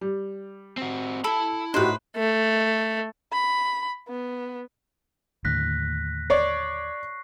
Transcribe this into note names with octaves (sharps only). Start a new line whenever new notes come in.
G3
C4 F#4
E4 A4 B5
A2 D#4 F#4 G4 B4 C5 F#6
A3
B5
B3
D#2 A2 D3 F#6 A#6 B6
C#5 D5 C#6 C7